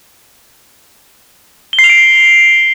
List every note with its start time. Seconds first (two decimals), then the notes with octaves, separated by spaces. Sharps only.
1.73 G7
1.79 C7
1.84 F7
1.89 D7